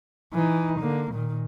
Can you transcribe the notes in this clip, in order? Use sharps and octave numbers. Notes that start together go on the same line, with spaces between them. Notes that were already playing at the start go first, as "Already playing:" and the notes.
E3 D#4
D3 A#3
A#2 D#3